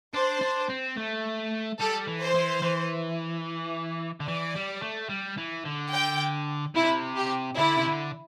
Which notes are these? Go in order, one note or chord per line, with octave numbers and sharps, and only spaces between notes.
D4 C5
D4
C4
A3
G3 A4
E3
C5
E3
E3
D3
E3 D5
G3
A3
G3
E3
D3
G5
C3 E4
G4
D3 E4
C3
D3